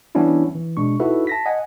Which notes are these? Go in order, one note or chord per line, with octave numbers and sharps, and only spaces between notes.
E3 G3 B3 C#4 D4 E4
E3
B2 G#3 D4 C#6
D#4 E4 F#4 A4 B4 E5
A5 A#6 B6
D#5 F#5 G#5